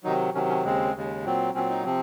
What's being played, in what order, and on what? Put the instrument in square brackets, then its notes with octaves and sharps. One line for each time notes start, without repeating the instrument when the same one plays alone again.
[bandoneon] C3 D#3 F#3 D#4
C3 D#3 F#3 C#4
C#4
D#2 C#3 G#3 C4
D#2 C#3 G#3
A#2 F#3 C4
A#2 F#3 C4 C#4
D#4
C3 F3 C4